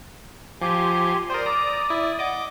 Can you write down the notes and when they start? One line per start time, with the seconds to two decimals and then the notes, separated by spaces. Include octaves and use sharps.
0.61 F3 G4 G#5 C6 D6
1.30 A#4 C5 D5 C6 D#6
1.46 A#5 D6
1.90 E4
2.19 D#5 F#5 D6